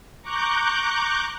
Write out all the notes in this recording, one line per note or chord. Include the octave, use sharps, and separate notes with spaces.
A#5 C#6 D6 F#6 G6